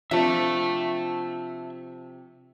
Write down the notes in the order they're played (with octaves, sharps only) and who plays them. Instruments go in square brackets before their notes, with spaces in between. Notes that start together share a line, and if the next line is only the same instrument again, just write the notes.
[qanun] C3 F3 D4 [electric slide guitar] E5 A5